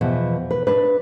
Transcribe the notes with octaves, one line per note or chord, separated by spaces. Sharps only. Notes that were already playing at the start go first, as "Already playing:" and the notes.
E2 B2 F3
B4
D4 B4